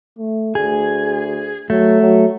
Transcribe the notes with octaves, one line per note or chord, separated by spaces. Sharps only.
A3
D2 G#4
F#3 A3
F#3